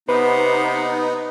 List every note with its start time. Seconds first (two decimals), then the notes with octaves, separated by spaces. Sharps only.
0.09 C3 B3 D#4 B4